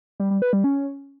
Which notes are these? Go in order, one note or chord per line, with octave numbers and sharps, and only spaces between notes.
G3
G3
B4
G3
C#4